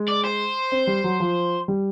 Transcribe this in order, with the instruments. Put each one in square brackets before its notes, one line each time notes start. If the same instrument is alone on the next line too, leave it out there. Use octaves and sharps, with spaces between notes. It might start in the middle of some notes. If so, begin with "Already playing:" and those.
Already playing: [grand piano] G#3
[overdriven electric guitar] D5
C5
[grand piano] C4
G3
F#3
F3
G3